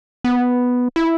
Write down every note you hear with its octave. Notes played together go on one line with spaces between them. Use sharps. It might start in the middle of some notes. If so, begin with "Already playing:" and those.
B3
E4